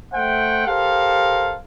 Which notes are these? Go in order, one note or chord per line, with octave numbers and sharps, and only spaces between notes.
A3 C5 E5 F#5 G5
G4 A4 A#4 C5 F5